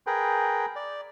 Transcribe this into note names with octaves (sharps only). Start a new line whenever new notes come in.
G#4 A#4 B4 G5
D5